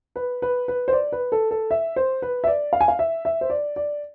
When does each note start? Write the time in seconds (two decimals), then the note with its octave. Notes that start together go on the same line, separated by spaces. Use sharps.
0.16 B4
0.42 B4
0.68 B4
0.88 C5
0.93 D5
1.12 B4
1.32 A4
1.51 A4
1.71 E5
1.96 C5
2.22 B4
2.44 E5
2.47 D5
2.73 F5
2.80 G#5
2.88 F5
2.99 E5
3.25 E5
3.41 C5
3.50 D5
3.76 D5